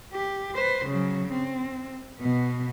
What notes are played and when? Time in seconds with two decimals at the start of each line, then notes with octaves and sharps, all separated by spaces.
0.13 G4
0.55 B4 C5
0.86 C#3 F#3
1.32 C4
2.19 B2 B3